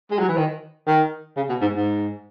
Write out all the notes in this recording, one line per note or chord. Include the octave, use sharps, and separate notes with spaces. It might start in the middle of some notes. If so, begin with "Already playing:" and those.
G#3
F#3
E3
D#3
D#3
C#3
B2
G#2
G#2